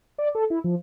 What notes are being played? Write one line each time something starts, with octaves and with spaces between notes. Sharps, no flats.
D5
A4
E4
F3